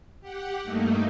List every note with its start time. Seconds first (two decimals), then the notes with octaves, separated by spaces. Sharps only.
0.21 G4 F#5
0.63 G2 A3 A#3 D#4